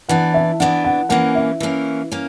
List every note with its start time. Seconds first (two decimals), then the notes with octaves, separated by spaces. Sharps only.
0.09 E3 B3 D4 F#5
0.34 E5
0.60 E3 B3 D4 F#5
0.84 F#5
1.09 E3 A#3 C#4 F#5
1.35 E5
1.60 E3 A#3 C#4
2.12 A#3 C#4